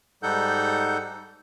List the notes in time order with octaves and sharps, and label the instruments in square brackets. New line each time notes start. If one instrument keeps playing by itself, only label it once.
[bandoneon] G#2 G3 D#4 A4 F#5 G6